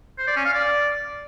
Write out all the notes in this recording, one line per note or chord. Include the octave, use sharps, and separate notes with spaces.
C5
D5
C#4
F5
D5